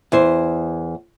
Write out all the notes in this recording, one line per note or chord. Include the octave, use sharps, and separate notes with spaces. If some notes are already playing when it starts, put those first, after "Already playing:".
E2 E4 C5